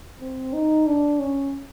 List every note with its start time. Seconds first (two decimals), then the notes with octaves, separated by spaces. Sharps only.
0.21 C4
0.54 D#4
0.87 D4
1.20 C#4